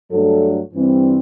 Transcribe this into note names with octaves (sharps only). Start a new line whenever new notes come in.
G2 F#3 A3 D4 A4
G2 E3 G3 C4